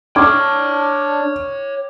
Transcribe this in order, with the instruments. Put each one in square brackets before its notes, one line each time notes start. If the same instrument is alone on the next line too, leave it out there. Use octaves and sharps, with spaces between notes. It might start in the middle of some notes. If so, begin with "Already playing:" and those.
[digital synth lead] D4 [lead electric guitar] C#5 G5 [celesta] C#6 F6 G#6 [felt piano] D6